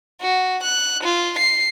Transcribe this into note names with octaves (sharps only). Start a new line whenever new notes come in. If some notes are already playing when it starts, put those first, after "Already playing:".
F#4
F#6
F4
C7